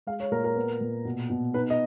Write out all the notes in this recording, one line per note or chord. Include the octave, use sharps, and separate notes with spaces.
G#3 F5
C#5
A#2 A#4
A#4
B3
A#2
B2
B2
D#4 B4
D#5